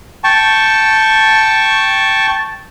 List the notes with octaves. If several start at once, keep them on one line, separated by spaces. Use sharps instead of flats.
G5 A5 C#6